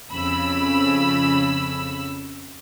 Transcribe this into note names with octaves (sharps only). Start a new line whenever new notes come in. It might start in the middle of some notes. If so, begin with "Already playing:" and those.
F2 C#3 B5 E6